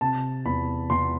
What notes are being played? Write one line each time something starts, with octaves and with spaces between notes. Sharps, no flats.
C3 A5
E2 B5
E2 C6